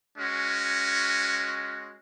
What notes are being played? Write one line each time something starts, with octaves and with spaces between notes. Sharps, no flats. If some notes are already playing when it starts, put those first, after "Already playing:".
G#3 C#4 F#4